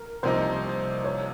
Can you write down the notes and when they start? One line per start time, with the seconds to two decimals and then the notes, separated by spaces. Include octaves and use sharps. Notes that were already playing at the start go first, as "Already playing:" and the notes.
Already playing: A#4
0.23 C2 C3 F3 A#3 D#4 C5
1.04 C#5